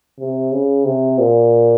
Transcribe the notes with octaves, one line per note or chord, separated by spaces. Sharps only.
C3
C#3
C3
A#2